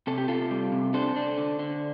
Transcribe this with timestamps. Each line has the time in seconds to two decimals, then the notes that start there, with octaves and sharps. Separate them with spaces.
0.07 C3 A4
0.18 G4
0.28 C3 F4 A4
0.51 G3
0.72 C3
0.94 D4 A4 C5
1.16 D4
1.38 D3
1.59 D3